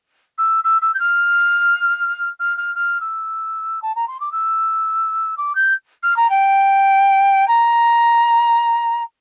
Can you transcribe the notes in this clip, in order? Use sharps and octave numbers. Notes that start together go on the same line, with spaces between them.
E6
E6
E6
G6
F6
F6
F6
F6
E6
A5
A#5
C6
D6
E6
D6
G6
F6
A#5
G5
A#5